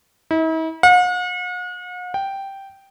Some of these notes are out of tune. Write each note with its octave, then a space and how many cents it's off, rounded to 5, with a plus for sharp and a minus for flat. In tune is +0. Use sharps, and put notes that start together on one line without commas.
E4 -45
F#5 -45
G5 -5